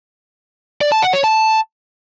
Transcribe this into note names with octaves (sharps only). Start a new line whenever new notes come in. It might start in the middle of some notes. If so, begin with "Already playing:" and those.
D5
A5
F#5
C#5
A5